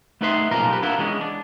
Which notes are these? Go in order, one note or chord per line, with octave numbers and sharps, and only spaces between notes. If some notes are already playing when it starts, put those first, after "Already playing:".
A3 B3 D#4 B4 E5 C6
B1 A#2 C#3 F3 A#4 A#5
G4 B4
D4 E4 F4 A#4 F#5
E3 G#3 B3 C#4
D4